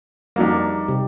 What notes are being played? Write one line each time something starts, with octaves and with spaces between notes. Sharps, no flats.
F2 F#3 G3 A#3 D#4 D5
C3 G3 G4